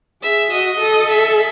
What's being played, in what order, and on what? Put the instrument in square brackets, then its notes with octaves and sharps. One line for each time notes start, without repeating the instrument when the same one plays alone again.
[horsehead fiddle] G#4 [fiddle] E5
[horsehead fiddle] F#4 [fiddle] D#5
[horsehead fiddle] A4
[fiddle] E5